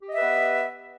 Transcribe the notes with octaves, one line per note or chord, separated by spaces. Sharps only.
B3 G4 B4 D#5 E5